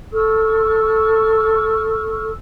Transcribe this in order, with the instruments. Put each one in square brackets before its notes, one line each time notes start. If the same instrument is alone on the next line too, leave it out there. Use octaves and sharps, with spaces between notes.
[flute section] A4 C#6 E6 F6